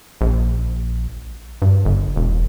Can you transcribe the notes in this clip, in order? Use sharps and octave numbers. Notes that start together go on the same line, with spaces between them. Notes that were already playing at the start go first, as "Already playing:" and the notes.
A#1
G2
G1
E1